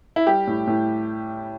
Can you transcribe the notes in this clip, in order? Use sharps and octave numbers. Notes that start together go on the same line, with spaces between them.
E4
G3 G4
A2
A2